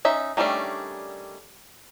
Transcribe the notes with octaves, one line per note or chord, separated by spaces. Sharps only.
C#4 D#4 E5
D#3 G3 A3 C#4 D4